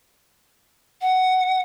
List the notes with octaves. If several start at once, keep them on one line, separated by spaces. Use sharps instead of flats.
F#5